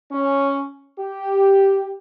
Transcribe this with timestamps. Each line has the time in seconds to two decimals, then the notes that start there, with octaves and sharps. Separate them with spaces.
0.11 C#4
0.98 G4